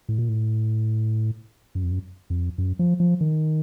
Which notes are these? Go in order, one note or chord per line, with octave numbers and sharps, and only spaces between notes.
A2
A#2
A2
F#2
F2
F#2
F2
F#2
F3
F3
D#3